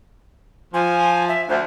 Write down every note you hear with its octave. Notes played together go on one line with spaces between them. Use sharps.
F3 G#5
E5
D2 C5